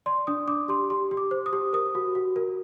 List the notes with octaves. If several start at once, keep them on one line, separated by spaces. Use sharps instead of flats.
D5 C6
D4 D#6
D4 D6
G4 C6
G4 C6
G4
D6
C5
D#6
G4
A#4 D#6
F#4
F#4
A#4